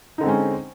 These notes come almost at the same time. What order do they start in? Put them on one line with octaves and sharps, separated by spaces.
D#4 D3 C4 G#3 C#4